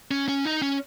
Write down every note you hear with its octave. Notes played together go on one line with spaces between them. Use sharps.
C#4
C#4
D#4
C#4